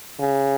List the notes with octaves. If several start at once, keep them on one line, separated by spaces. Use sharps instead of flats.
C#3